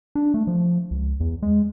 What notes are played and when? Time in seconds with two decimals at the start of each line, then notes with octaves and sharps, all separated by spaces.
0.15 D4
0.34 A3
0.47 F3
0.91 C#2
1.20 E2
1.43 G#3